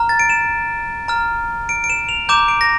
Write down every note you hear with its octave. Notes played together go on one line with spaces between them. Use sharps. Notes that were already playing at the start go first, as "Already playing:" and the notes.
Already playing: A#5 F6
A6
D7
E7
A#5 F6
D7
D7
E7
F7
A#5 D6 G6 E7
D7
A#6